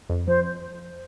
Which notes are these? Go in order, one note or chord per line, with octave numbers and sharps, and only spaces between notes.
F2
F3 C5